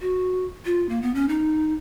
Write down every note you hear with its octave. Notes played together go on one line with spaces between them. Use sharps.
F#4
F4
A#3
B3
C#4
D#4